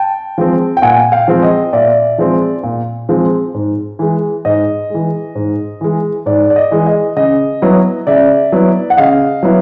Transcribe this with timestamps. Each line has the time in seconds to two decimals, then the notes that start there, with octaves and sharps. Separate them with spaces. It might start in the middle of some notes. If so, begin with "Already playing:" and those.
Already playing: G5 A5
0.38 F3 G#3 C4
0.77 G5
0.82 A#2 F#5 G#5
1.12 F5 G5
1.28 F3 G#3 C4
1.43 D#5
1.73 A#2 D5 E5
2.18 F3 G#3 C4
2.63 A#2
3.09 F3 G#3 C4
3.54 G#2
3.99 E3 G#3
4.45 G#2 D#5
4.90 E3 G#3
5.35 G#2
5.81 E3 G#3
6.26 G#2 D5
6.50 D5
6.56 D#5
6.71 E3 G#3
6.86 D#5
7.17 C#3 D#5
7.62 F#3 B3 E4
8.07 C#3 D5 E5
8.52 F#3 B3 E4
8.90 F#5
8.97 C#3 D#5 F5
9.43 F#3 B3 E4